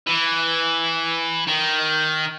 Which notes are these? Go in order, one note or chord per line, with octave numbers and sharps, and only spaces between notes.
E3
D#3